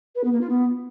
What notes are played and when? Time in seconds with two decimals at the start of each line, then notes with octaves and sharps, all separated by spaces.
0.15 B4
0.24 B3
0.32 A#3
0.41 F4
0.49 B3